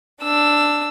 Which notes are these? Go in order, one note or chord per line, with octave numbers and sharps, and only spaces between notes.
D4 E6